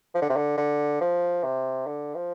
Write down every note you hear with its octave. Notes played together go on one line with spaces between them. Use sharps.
F3
D3
C3
D3
D3
F3
C3
D3
F3